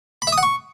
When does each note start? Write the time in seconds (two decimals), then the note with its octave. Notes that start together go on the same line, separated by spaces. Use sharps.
0.22 B5
0.27 E5
0.32 D#6
0.38 F#5
0.43 C#6